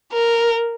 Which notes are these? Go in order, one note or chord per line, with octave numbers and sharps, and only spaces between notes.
A#4